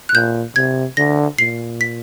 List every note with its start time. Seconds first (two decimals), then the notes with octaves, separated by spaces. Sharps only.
0.09 F#6
0.14 A#2 G6
0.56 C3 G#6
0.97 D3 A#6
1.38 A#2 C7
1.81 B6